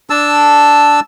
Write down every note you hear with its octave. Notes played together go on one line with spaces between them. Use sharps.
D4 A5 E6